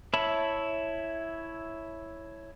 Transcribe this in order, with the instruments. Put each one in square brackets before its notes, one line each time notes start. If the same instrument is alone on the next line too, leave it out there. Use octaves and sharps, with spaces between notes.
[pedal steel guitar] E4 C#5 E5 A5 B5